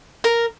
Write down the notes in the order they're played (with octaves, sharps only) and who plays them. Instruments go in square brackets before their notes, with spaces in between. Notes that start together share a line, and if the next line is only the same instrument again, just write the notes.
[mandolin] A#4